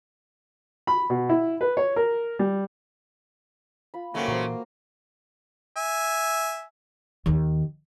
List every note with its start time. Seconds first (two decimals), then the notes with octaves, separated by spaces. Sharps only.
0.87 B5
1.10 B2
1.29 E4
1.61 B4
1.77 C#5
1.96 A#4
2.39 G3
3.94 F4 B5
4.14 G#2 C#3 F#3 A3 A#3 F#4 G5
4.28 A#2 E3 F#4 A#4 C5
5.77 E5 G#5
7.26 D#2 D#3